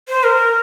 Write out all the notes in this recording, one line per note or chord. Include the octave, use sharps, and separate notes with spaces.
C5
A#4